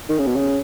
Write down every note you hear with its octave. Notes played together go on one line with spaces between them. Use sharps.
D#3
C#3
B2
C#3